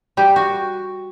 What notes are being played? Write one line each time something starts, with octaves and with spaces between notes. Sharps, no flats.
G3 G4
F#4